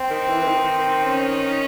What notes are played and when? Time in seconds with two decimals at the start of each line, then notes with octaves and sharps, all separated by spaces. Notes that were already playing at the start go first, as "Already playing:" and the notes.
Already playing: C4
0.10 D#3
0.29 E3
0.42 E3
0.48 D#3
1.04 C#4